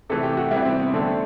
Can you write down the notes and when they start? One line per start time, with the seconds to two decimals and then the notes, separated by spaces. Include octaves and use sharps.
0.10 C3 E3 A3 A4
0.23 G4
0.37 F#4
0.51 C3 E3 G3 E4
0.65 C4
0.79 B3
0.94 D3 A3 C4